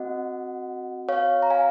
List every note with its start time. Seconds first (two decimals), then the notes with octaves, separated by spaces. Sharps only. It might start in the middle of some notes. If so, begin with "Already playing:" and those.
Already playing: C4 F#4 D#5 F#5
1.09 C#5 F5
1.42 A#5
1.50 F5 G#5